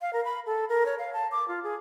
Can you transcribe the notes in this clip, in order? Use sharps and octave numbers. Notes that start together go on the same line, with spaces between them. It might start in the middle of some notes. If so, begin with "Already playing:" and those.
F5
A#4
B5
A4
A#4
C#5
F5
A5
D6
F4
G#4